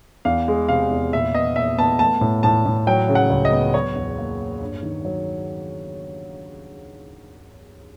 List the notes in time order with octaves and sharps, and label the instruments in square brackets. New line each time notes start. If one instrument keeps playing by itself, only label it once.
[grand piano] E2 [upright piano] F5
[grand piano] G#3
[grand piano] C3 [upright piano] F5
[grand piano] E2
[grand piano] A#2 [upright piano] E5
[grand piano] B3 [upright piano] D#5
[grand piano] A#2 [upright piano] E5
[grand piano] B3 [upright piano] A5
[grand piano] A3 [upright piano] A5
[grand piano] A2
[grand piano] A2 [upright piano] A5
[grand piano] A2
[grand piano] F#3 [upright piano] G5
[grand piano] C#3
[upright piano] F#5
[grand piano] C#2
[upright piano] D#5
[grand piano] B3
[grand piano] F#3 [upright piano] C#5
[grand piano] E2
A#3
A#3
G2
D#3
F#3